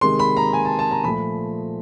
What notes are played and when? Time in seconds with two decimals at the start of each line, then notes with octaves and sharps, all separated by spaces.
0.01 C3 D#3 G#3 C6
0.19 B5
0.37 A#5
0.53 G#5
0.65 A5
0.79 A5
0.91 A#5
1.03 A#2 F3 A3 B5